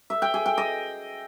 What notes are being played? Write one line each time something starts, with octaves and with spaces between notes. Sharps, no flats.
E5
G5
G#4
G5
D#5